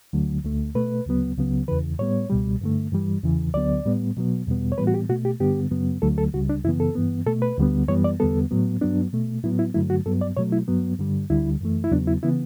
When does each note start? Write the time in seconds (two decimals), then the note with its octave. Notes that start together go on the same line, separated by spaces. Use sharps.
0.13 D2 D3 F#3 A3
0.44 D2 D3 A3
0.75 B2 A3 B4
1.06 D2 C#3 F#3 B3
1.38 C#2 C#3 F#3 B3
1.68 E2 C#3 E3 B4
1.99 A2 G3 B3 C#5
2.30 C#2 B2 G3
2.61 G2 D3 A3
2.92 G2 E3 G3
3.24 E2 C#3 E3
3.54 D2 D3 F#3 B3 D5
3.85 A2 G3 B3
4.16 B2 F#3 B3
4.47 E2 B2 G3 B3
4.72 C#5
4.78 A2 E3 G3 B3 B4
4.87 F#4
4.94 G4
5.09 B2 A3 F#4
5.25 G4
5.40 G2 D3 G3 B3 G4
5.71 F#2 C#3 F#3 B3
6.02 D2 D3 F#3 A3 A4
6.18 A4
6.33 C#2 C#3 G3 F#4
6.49 D4
6.64 F#2 C#3 E3 B3 E4
6.80 A4
6.95 G2 E3 B3
7.27 B2 A3 A4
7.42 B4
7.58 D2 D3 G3 B3
7.88 F#2 E3 G3 B3 C#5
8.04 D5
8.20 E2 D3 G3 B3 A4
8.51 A2 F#3 B3
8.81 G2 F#3 B3 D4
9.13 B2 A3
9.44 A2 F#3 B3 E4
9.59 E4
9.74 G2 D3 F#3 A3 E4
9.90 F#4
10.05 G2 F#3 B3 A4
10.21 D5
10.37 B2 F#3 A3 C#5
10.52 E4
10.68 G2 F#3 B3
10.99 G2 D3 G3
11.30 D2 D3 G3 E4
11.61 F#2 E3 A3
11.84 E4
11.91 E2 C#3 F#3 B3 D4
12.07 E4
12.23 C#3 E3 B3 E4